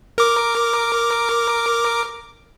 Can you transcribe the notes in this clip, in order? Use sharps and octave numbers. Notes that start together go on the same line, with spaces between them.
A#4 D6